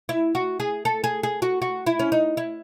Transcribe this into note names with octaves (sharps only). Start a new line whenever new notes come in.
E4
F#4
G#4
A4
G#4
G#4
F#4
F#4
E4
C#4
D#4
E4